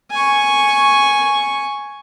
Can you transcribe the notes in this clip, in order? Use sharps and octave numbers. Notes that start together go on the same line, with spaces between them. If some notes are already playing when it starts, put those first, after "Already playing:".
G#5 C#6